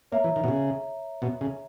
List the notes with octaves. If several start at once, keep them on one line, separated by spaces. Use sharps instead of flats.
A#3 C#5 E5 A#5
E3
D#3
B2
C#3
B2
C#3